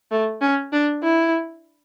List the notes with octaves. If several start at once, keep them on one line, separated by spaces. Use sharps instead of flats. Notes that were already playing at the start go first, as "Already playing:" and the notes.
A3
C#4
D4
E4